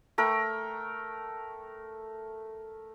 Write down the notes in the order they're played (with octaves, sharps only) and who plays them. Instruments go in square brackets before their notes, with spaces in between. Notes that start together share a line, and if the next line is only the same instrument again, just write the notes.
[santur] A3 A#4 G5